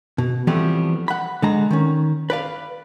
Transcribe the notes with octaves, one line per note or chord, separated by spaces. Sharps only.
B2
E3 F3 G3 A3 B3 C4
F#5 B5
D3 G#3 A#5
D#3 C#4
B4 D5 F5